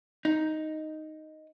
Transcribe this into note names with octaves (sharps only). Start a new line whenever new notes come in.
D#4